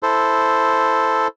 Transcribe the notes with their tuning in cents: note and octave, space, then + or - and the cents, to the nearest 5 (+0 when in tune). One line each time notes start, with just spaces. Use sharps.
E4 -5 A4 +0 C5 +0